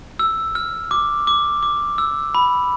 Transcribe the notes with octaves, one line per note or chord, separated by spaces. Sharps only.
E6
F6
D6
D6
D6
E6
B5